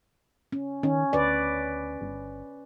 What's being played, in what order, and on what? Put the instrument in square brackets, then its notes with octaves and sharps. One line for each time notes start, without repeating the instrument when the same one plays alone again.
[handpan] C#4
[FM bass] D#3 [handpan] C#4
[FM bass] D2 [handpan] B4 D5
[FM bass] G1